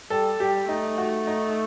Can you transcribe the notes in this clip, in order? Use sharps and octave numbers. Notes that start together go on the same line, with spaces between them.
G3 A4
G3 G4
A3 D#4
F#4
D#4